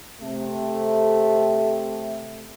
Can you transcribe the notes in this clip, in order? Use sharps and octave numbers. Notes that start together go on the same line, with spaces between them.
C3 A3